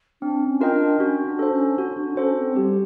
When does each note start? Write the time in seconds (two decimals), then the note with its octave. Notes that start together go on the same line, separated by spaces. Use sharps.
0.22 C4 D4
0.48 C#4
0.61 F4 A#4 D#5 G5
0.73 D4
0.99 C#4 F#4
1.26 D4
1.39 A4 C5
1.52 C#4
1.78 D4 F#4
1.92 C#4
1.97 D4
2.11 D4
2.17 C#4 A4 C5
2.37 C4
2.56 G3 G4